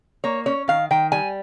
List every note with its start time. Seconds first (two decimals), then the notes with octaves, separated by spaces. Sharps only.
0.24 A#3 C#5
0.46 C#4 C#5
0.68 D#3 F5
0.91 D#3 G5
1.12 G3 G#5